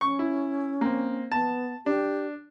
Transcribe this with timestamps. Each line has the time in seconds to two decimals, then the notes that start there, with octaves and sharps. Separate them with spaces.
0.01 C#4 C#6
0.19 E4
0.81 A#3 C4
1.32 B3 A5
1.86 D4 G4